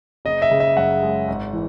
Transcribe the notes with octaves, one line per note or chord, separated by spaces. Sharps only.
F#1 D#5
E5
C#3
E5
F#2 F#5
G#3
G#1
E3